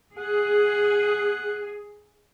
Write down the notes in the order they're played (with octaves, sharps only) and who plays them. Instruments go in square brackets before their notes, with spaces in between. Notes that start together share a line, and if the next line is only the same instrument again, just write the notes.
[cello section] G#4 [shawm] F#5